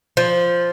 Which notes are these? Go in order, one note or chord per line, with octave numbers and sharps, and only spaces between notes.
F3